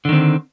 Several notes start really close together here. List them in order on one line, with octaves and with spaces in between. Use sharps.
D3 D#3 C4